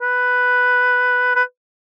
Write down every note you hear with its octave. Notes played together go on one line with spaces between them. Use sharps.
B4
B4